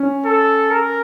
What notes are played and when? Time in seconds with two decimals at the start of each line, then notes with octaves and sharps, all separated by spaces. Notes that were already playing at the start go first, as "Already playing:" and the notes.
Already playing: C#4
0.25 A4
0.71 A#4